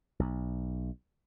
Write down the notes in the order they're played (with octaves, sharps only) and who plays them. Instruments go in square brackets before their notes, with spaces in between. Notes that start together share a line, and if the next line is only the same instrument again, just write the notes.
[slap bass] B1